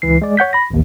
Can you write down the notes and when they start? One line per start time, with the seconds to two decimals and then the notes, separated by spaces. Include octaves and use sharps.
0.02 C#2 E3 C7
0.22 G#3 D5
0.37 C#5 F#5 G6 B6
0.53 B5 A#6
0.70 A1 D#2